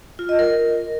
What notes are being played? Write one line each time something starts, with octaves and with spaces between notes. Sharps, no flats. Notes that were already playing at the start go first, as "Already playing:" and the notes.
F4
D#5
A#4